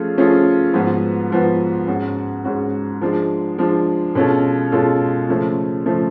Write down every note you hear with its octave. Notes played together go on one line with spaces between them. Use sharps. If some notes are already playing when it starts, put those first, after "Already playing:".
Already playing: F3 A3 C#4 F4 G#4
F3 A3 C#4 F4 G#4
G#2 F3 B3 F#4 B4
G#2 F3 B3 F#4 B4
G#2 G#3 C#4 F#4
G#2 G#3 C#4 F#4
F3 G#3 D4
F3 G#3 D4
B2 G#3 C#4 F4 A4
B2 G#3 C#4 F4 A4
C#3 F3 A3
C#3 F3 A3